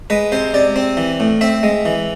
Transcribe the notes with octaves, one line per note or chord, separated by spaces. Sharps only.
G#3 B4
C3 C5
C3 D5
C4
E3
A2
C4 E5
G#3
E3